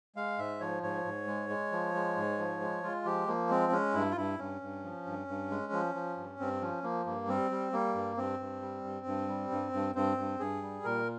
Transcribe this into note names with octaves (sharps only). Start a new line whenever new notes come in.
G#3 F5
G#2 E5
F3 C#5
G#2 C#5
G#2
G#3
G#3
F3
G#3
G#2
F3
G#3
G#3 F4
F3 G4
F3 A#3
G#3 C4
G#3 C#4
G2 E4
F4
G2 E4
G2 C#4
G2
F3
G2
G2
G#3
F3
F3
G2
G2 C4
F3 C#4
F3 A#3
G2 A#3
G3 C4
G3
G3 A#3
G2
G2 C4
G2
G3
G2
G2
G3
G2
G2
G2 C4
G2
G2 G#4
G3
A#2 A#4